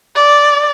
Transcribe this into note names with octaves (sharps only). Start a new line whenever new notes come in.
D5